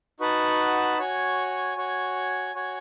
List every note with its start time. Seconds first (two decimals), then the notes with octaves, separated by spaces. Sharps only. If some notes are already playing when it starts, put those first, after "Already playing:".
0.20 D#4 F#4 B4 F#5 A5
0.98 F#4 C#5 G#5
1.77 F#4 C#5 G#5
2.55 F#4 C#5 G#5